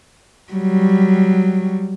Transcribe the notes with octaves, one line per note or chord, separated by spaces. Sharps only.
F#3 G3